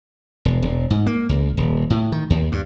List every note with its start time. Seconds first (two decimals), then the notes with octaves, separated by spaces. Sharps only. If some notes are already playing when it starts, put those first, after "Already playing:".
0.45 E1
0.62 E1
0.90 G#2
1.06 A#3
1.29 C#2
1.57 D#1
1.90 A2
2.12 D#3
2.30 D#2
2.52 G2